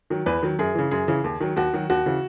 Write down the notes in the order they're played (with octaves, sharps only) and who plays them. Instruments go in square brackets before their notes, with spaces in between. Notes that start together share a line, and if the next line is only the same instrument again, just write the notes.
[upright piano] D#3 F#3
E2 B4
D#3 F#3
F#2 G#4
C#3 E3
F#2 G#4
C#3 E3
D#2
D#3 F#3
D#2 F#4
D#3 F#3
D#2 F#4
C#3 E3